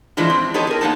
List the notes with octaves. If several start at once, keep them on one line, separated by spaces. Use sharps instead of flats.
A2 E3 F3 G#3 D4 E4
C4
B3 G4 A4 C#5 D#5
G#4 A#4
A#3 B3 D#4 G4 A5